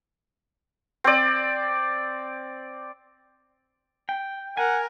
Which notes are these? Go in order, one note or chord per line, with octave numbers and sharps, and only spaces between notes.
C4 D5
G5
A#4 F#5 G#5